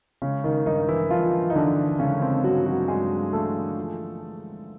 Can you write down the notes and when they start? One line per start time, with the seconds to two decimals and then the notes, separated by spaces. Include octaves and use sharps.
0.22 C#3 G#3 C#4
0.44 D#3 D#4
0.66 G2 D#3 D#4
0.88 E3 E4
1.10 G2 F3 F4
1.50 D#4
1.55 D3 E3 D4
1.99 C#3 G#3 C#4
2.22 C4
2.44 G2 F#3 F#4
2.66 F#3 F#4
2.88 G2 G#3 G#4
3.33 E3 A3 A4
3.77 F3
4.21 G#3